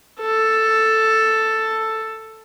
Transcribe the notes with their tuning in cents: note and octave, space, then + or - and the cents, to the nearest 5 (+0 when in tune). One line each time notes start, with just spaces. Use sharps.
A4 +5